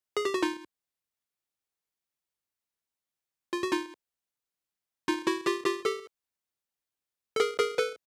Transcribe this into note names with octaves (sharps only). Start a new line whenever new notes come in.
G#4
G4
F#4
D#4 F4
F4
F#4
D#4 F4
D#4 F4
E4 F#4
F4 G4
F4 G4
G4 A4
A4
G#4 A#4
G#4 A#4
A4 B4